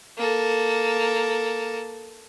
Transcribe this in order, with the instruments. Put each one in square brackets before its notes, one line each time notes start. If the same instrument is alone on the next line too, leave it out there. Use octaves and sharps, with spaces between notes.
[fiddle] A#3 A4